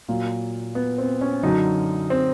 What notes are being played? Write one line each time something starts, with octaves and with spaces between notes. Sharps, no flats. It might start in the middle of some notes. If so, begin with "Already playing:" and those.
A#2 F#3 A#3
B3
C4
C#4
F#2 D3 F#3 D#4
C4